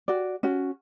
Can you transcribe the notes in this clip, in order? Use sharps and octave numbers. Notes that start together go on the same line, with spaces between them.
F#4 D5
C#4 F#4